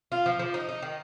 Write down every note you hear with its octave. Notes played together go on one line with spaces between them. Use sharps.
F4
F3
F3
D#4
D#4
D#3